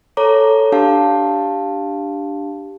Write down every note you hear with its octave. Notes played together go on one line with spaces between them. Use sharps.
A4 C#5 A#5 D6
D4 G4 F5 A5